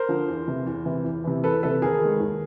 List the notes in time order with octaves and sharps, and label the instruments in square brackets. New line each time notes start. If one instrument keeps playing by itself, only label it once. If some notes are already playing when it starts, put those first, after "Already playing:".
Already playing: [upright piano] A#4 C5
D3 F3
E2
C3 E3
E2
C3 E3
E2
C3 E3
E2 A4 B4
C3 E3 A4 B4
D#2 G#4 A#4
D#3 G#3
D#2